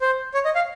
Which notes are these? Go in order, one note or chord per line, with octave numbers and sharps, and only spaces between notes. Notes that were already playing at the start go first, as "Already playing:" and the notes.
C5
C#5
D#5
F5